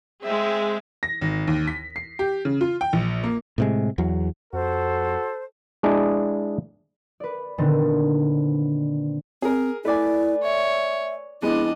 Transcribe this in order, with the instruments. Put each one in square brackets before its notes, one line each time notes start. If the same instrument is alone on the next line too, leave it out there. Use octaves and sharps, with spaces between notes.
[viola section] G#3 C4 G#4 [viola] E5
[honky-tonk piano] A#6
G#1
D#2
B6
C7
G4
C#3
F4
G5
A#1
A#3
[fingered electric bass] A2 C3 G#3
E2 F#3
[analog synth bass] F2 [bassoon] F#4 [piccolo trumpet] A4 [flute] C5
[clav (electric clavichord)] G#3 D4 E4 G#4 D5 D#5
[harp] B4 D5
A#2 D3 D#3 B3 C4
[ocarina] C4 [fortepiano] G#4 A#4
[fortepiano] A3 G#5 [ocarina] E4 [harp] B4 D5
[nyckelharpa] C#5 [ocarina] E5
[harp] F2 [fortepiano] G#3 B3 [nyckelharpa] D4 D#5 [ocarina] E4